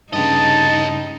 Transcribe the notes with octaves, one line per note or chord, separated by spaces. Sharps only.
G2 C#3 D#4 G4 D#5 A5